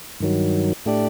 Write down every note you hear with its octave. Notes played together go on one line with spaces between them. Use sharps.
G2 D#3 F#3
A2 A3 D4 G4 D5